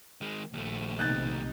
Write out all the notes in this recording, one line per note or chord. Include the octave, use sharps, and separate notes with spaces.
D#3 G#3
A#1 D#2 A3
B1 C3 D#4 F#6 G6 A6